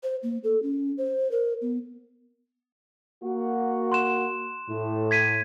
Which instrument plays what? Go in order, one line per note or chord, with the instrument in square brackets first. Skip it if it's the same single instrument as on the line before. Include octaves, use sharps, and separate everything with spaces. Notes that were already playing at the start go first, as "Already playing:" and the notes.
[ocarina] C5
A#3
A4
C#4
C5
A#4
B3
[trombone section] A#3 F#4
[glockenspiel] C6 F#6 E7
[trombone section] A2
[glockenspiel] G#6 B6 D#7